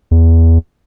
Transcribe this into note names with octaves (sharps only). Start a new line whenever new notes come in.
E2